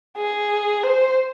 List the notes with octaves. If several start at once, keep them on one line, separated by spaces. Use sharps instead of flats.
G#4
C5